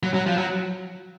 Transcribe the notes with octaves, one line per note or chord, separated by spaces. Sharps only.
F#3
F#3
F3
F#3